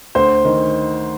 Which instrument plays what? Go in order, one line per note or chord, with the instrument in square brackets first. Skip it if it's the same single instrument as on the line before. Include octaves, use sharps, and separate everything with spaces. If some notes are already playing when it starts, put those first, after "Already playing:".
[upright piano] D2 C5
D#3